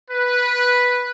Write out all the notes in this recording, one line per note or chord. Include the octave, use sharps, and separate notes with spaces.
B4